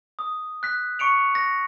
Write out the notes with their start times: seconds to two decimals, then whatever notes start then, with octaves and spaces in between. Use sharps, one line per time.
0.19 D#6
0.63 F#6 B6
0.99 C#6 C#7 D7 F7
1.35 A#6